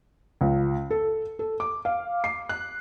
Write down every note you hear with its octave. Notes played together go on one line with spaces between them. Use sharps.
C#2
A4
A4
D6
F5
C7
F#6